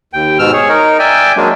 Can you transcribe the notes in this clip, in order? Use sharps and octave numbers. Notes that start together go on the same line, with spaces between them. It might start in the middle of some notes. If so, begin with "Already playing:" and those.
D#2 G5
G#2 B2 E6 F6
G#4 C#5
D#4 A#4
D5 E5 G5 G#5
F#3 G#3 A#3 D4